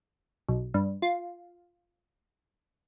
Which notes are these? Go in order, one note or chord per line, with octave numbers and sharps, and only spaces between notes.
B1
G2
F4